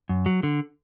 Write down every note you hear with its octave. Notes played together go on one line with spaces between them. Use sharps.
F#2
F#3
D3